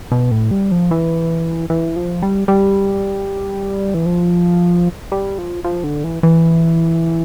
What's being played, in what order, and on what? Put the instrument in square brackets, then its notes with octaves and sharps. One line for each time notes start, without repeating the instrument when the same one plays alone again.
[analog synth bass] B2
A2
G3
F3
E3
E3
F3
G3
G3
E3
F3
G3
F3
F3
D3
E3
E3